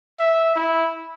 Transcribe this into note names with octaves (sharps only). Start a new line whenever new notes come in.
E5
E4